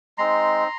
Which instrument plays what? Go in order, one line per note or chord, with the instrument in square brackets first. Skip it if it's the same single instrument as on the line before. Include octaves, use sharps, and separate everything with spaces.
[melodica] G#3 C4 D#4 A#5 C6